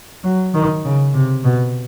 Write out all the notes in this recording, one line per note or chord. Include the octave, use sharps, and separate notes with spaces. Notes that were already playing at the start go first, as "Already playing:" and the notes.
F#3
D#3
C#3
C3
B2